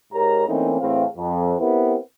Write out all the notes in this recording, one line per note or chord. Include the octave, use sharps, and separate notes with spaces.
G#2 G4 A#4 C#5 A#5
E3 A3 A#3 C4 C#4 D#4
A2 E3 C4 G#4 F5
F2
B3 C4 E4 G4 A#4 B4